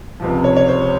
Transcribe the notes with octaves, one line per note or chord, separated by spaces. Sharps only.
C#2 C3 F3
C#5
C#5
C5